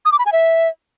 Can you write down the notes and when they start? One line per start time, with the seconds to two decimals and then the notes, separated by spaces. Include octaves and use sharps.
0.05 D#6
0.12 D6
0.19 B5
0.26 G#5
0.33 E5